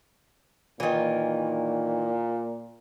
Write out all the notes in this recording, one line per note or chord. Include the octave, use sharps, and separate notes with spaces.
A#2 D#3 E3